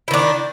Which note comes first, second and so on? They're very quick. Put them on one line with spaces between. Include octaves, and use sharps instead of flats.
E4 D#3 D4